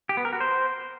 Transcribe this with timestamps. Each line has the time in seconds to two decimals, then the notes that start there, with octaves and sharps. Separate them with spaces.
0.09 G4
0.17 B3
0.25 A#4
0.33 F#4
0.40 C5